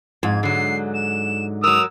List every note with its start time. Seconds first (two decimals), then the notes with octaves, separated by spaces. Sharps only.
0.23 F2 G#2 G#6
0.43 D3 F#3 C7
0.94 E7
1.64 F#3 A#4 D#6 E6 F7